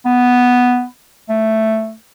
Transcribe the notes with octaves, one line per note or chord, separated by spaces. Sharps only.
B3
A3